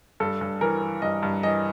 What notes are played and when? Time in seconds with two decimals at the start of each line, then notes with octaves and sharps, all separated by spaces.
0.20 G2 A4
0.41 G2
0.61 E3 A#4
0.82 E3
1.02 G2 D#5
1.23 G2
1.43 E3 D#5